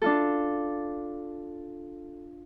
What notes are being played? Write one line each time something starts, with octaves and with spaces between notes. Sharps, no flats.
D4 F4 A4